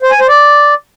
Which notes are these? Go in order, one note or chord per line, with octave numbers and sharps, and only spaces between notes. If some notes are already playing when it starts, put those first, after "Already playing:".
C5
G#5
C5
D5